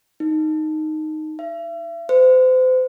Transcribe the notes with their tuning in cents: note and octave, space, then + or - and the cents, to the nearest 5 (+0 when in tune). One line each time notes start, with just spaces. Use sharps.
D#4 -5
E5 +40
C5 -35